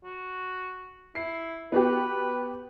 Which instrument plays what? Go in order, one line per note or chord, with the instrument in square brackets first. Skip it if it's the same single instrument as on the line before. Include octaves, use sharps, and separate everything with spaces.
[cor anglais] F#4
[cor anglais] E4 [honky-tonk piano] C7
[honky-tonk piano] B3 F#4 G4 [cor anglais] B4